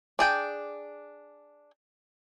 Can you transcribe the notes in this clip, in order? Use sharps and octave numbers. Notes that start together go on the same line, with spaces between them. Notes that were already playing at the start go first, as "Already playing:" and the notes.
D4 G#4 G5